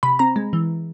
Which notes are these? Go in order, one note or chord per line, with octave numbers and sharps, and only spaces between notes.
C3 B5
C4 A#5
G#3
E3